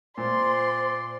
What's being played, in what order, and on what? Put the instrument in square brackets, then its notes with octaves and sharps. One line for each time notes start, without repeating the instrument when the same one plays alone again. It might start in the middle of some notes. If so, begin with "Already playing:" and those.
[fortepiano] A#2 [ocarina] C5 [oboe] D5 [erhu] C6